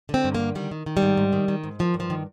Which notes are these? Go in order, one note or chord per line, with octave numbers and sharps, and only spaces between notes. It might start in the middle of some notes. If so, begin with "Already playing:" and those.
D3 C4
G2
A#3
D3
D#3 G3
D#3
D#3
G3
G#2
G#2
D#3
D#3
G#2
D#3 F3
G2
F3
D#3